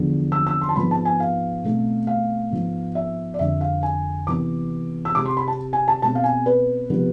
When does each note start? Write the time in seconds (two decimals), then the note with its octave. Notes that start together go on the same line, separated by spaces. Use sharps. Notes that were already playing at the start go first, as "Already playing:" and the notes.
Already playing: E2 D3 F3
0.32 E6
0.47 E6
0.61 C6
0.69 A5
0.76 G#2 F3 B3 B5
0.91 A5
1.05 G#5
1.20 F5
1.64 B2 A3 C4
2.07 F5
2.51 G#2 F3 B3
2.95 E5
3.34 D5
3.39 F2 D3 G#3 E5
3.61 F5
3.83 G#5
4.27 C3 E3 B3 D6
5.05 E6
5.15 C3 G#3 C4 D6
5.26 C6
5.37 B5
5.48 A5
5.73 G#5
5.88 A5
6.02 B2 G#3 C4 A5
6.15 F5
6.24 G#5
6.46 B4
6.90 C3 F3 G#3 B3